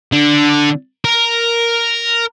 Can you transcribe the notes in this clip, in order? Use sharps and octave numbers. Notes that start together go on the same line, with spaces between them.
D3
A#4